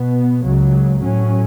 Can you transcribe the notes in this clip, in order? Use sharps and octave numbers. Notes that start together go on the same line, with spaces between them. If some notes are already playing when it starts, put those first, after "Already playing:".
Already playing: B2 B3
C#2 C#3 F#3
A2 F#3 C#4